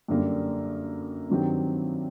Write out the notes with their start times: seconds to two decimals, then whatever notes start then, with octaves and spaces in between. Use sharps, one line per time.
0.08 F#2 D3 G3 A#3
1.30 G2 D#3 F#3 C4 G4